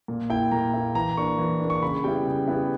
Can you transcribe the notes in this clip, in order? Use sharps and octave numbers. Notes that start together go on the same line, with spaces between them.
A#2
A#3 E4 G5
A#2 A#5
A#3 E4
E3 A#5
A#3 D4 C#6
E3
A#3 D4
C#6
C#3 B5
G3 B3 E4 G5
C#3
G3 B3 E4